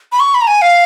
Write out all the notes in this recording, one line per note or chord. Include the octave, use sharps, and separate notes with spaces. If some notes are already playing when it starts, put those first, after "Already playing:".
B5
C#6
B5
A#5
G#5
F5